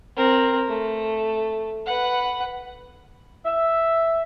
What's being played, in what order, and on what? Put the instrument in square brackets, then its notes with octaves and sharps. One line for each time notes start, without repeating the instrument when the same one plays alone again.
[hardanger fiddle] C4 A#4
A3
B4 F#5
[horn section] E5